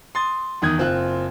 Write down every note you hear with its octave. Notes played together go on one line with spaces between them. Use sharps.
C6 D#6 A6
E2 D#3 D#6 G#6
F#1 C4 F4 F#6